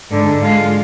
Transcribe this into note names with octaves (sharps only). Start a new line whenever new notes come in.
G#2 D3
G#3 F4